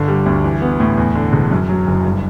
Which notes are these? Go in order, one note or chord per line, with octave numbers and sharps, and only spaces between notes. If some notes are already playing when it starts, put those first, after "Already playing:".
Already playing: G1 D3
G3
D2
E3
B3
A2
E2
D3
E1
F#2
F#3
F#1
G2